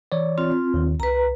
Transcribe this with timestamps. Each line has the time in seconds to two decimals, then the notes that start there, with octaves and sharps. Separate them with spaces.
0.12 E3 C#5 D5
0.38 C4 F4
0.74 D#2 D#3
1.00 C2 B4 A#5